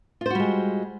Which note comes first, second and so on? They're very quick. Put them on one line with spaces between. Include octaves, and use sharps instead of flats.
F4 C5 F#4 G3 G#3